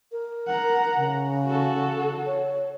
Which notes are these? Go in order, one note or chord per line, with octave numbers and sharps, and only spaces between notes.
A#4
F#5 A#5
C#3
F#4 A4
C#5